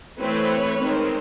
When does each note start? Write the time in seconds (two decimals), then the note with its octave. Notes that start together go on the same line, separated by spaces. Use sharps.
0.20 E3 A3 C4 B4 C#5
0.79 D#3 G#3 C4